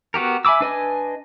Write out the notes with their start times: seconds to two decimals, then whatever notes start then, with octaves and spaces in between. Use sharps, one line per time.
0.14 B3 F#4 G4 A#4
0.45 E5 G#5 B5 D6 E6
0.61 D4 B4 D#5 G#5